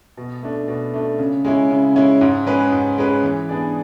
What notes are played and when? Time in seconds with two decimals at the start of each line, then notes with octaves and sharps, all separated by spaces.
0.17 B2
0.43 A3 D4
0.68 B2
0.94 A3 D4
1.19 C#3
1.45 G#3 C#4 E4
1.71 C#3
1.96 G#3 C#4 E4
2.21 G#2
2.46 G#3 C#4 G#4 B4
2.72 G#2
2.98 G#3 C#4 G#4 B4
3.23 E3
3.49 B3 D4 G#4 D5